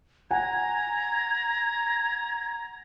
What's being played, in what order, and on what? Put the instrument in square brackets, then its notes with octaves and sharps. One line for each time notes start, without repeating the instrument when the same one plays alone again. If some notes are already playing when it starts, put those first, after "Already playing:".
[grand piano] F#5 G#5 [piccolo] A#5 [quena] G#6